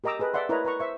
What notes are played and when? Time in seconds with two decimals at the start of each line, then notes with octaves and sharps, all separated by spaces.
0.04 G4 A#4 D#5 A#5 D6 E6
0.19 G#4 A4 B4 D#5
0.34 D5 E5 F#5 C6
0.49 E4 A#4 B4 C#5 D#5 A#5
0.65 B4 A#5 C#6
0.80 C5 E5 C#6